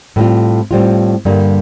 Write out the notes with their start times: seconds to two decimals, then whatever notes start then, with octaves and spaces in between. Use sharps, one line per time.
0.16 A2 G3 C4 F4
0.71 A2 G3 C4 F4
1.25 G2 D3 G3 A#3